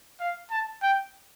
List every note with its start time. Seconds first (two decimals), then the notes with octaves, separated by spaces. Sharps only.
0.20 F5
0.51 A5
0.83 G5